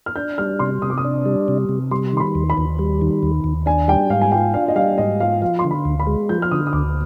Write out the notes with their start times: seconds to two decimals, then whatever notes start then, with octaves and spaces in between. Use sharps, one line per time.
0.06 F6
0.16 D4 G6
0.38 G3 F6
0.59 C3 C6
0.82 C3 D#6
0.90 D6
0.98 D#6
1.04 D4
1.25 G3
1.48 C3
1.69 C3
1.91 G3 C6
2.13 D#3 C6
2.20 B5
2.35 D#2
2.50 B5
2.57 D#2
2.79 G3
3.01 D#3
3.23 D#2
3.44 D#2
3.66 D4 G#5
3.88 G3 G5
4.10 G#2 F5
4.21 G#5
4.32 F4 G5
4.54 D4 F5
4.68 D#5
4.76 G3 F5
4.98 G#2 D#5
5.20 F4 F5
5.42 F3 F5
5.59 C6
5.64 D3
5.71 B5
5.85 D2
6.00 B5
6.07 G#3
6.29 F3 G6
6.42 F6
6.51 D3 D#6
6.67 D#6
6.73 D2 D6